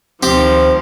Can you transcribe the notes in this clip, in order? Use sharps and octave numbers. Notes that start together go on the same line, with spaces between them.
D2 D#3 F3 C4 G4 C5